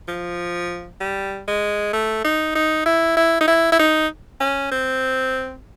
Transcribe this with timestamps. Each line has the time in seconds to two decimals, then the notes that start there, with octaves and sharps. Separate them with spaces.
0.08 F3
1.01 G3
1.48 G#3
1.93 A3
2.25 D#4
2.55 D#4
2.86 E4
3.17 E4
3.41 D#4
3.48 E4
3.72 E4
3.79 D#4
4.40 C#4
4.72 C4